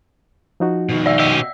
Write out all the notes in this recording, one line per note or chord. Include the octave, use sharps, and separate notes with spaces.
F3 D#4 F#4
B2 D#3
D5 E5 E6
C#4 G4 D#5 E6